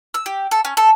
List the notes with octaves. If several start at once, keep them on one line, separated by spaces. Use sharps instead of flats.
E6
G4
A4
C#4
A4